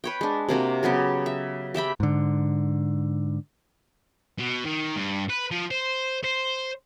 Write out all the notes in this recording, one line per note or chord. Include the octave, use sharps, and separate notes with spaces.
B4 C#5 G5
G#3 D4
C3 A#3 C4 F#4
C#3 F#3 B3 G4
E5
G4 E5 G5 B5
G#2 D3
B2
D#3
G2
B4
F3
C5
C5